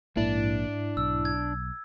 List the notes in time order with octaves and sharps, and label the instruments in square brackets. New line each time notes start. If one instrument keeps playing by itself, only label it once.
[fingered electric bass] A#1 A#3 [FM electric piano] G#2 E4 [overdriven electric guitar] D4
[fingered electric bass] B1 [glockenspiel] E6
[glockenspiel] G#6